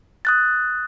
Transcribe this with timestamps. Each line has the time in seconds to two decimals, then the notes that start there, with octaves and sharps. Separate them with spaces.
0.25 D#6 F#6 A6